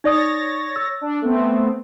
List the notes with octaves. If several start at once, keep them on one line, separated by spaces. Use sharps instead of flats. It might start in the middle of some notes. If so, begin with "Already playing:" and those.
D#4 C#5 D5 D#6 A6 A#6
E6
D4
A3 B3 C4